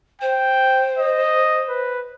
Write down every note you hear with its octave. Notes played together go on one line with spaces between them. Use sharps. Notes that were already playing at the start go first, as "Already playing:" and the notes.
C5 G5
D#5
B4